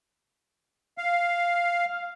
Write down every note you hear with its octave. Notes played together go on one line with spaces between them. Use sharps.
F5